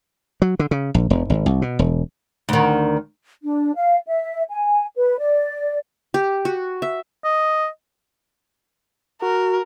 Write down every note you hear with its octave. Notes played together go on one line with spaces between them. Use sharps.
F#3
D3
C#3
A#1
E1
G#1
C2
B2
E1
D2 D#3
D4
F5
E5
G#5
B4
D5
G4
F#4
E5
D#5
F#4 A#4